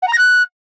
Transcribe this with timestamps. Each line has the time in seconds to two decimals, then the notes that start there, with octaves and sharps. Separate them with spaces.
0.02 F#5
0.07 A#5
0.13 A#6
0.18 F#6